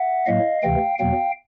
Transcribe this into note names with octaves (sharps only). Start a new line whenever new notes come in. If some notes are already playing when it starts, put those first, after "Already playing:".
Already playing: E5 F#5
A2 F#3 A#3 D#5 F5
D2 C3 E3 A3 F5 G5
E2 B2 F#3 A#3 F5 G5